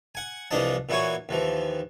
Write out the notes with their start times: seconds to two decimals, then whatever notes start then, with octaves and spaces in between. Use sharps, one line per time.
0.15 F#5 G#5
0.51 C2 E3 F3 D4 D#5 A5
0.89 A#2 E3 E4 F#4 C#5 G#5
1.29 D#2 E3 F3